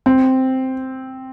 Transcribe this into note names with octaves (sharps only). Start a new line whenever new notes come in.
C4